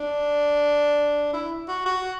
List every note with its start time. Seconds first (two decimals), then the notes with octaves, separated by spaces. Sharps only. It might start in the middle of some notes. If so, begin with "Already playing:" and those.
Already playing: D4
1.34 E4
1.68 F#4
1.86 F#4